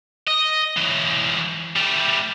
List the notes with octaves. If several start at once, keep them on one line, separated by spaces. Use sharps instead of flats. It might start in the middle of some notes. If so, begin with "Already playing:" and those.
D#5
E3 F#3
G3 A3